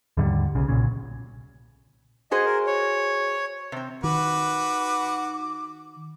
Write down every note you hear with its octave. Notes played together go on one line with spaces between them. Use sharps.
D#2 G#2 D3 G3
B1 C#3
B1 A#2 C#3
F#4 G#4 C5 D#5
A#4
C#5
C3 C4
D#3 F#4 B4 D6